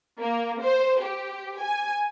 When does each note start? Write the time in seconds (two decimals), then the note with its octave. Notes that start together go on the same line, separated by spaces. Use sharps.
0.18 A#3
0.62 C5
1.01 G4
1.59 G#5